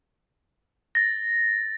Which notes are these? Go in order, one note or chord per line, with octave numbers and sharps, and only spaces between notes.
A6 A#6